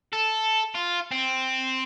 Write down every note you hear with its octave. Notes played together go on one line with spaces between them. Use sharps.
A4
F4
C4